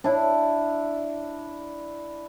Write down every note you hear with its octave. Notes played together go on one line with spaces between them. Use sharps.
D4 E4